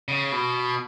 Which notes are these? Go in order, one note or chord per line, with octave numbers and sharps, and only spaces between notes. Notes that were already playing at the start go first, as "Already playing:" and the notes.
C#3
B2